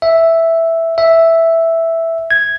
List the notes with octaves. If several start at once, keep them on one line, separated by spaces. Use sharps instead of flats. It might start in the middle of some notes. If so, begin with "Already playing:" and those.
E5
E5
G#6